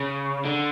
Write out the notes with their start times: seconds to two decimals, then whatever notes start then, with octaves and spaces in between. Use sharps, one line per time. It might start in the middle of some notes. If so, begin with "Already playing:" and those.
Already playing: C#3
0.45 D3